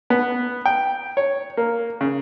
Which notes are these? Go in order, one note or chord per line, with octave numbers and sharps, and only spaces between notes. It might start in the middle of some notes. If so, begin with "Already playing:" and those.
B3
G5
C#5
A#3
C#3